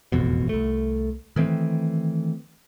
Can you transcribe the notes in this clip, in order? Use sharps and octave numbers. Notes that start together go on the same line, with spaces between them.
E1 A1 F2 B2
C2 A3
D#3 E3 A3 C4